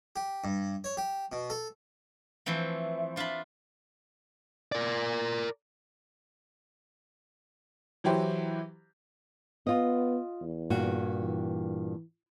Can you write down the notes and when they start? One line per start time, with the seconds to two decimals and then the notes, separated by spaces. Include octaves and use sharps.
0.16 G4
0.44 G2
0.84 C#5
0.97 G4
1.32 B2
1.50 A4
2.46 E3 F3 A3 C4
3.16 D4 F4 E5 A5 B5
4.72 A#4 D5
8.04 E3 F#3 E4 G4 C5
9.67 B3 F4 D#5
10.41 E2
10.70 G2 A#2 F#4
11.21 E3